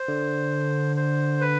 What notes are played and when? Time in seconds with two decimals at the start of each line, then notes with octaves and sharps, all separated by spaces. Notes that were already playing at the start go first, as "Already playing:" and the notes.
Already playing: C5
0.08 D3
0.96 C5
1.41 B4